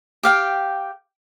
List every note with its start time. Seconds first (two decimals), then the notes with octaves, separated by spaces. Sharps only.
0.23 G4 F5 G5